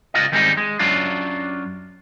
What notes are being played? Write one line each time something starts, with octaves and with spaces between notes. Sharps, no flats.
C#2 F4 D#5
D#3 G3 G#3 C4 D#4
G#3
F#2 F#3 D4 F4